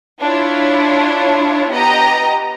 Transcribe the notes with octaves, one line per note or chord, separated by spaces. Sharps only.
D4 E4 F4 C#5
B3 G4 D#5 A#5